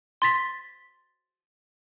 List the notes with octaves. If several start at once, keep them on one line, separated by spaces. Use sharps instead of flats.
C6 A6 B6